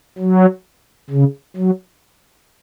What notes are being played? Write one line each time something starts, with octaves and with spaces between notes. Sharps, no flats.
F#3
C#3
F#3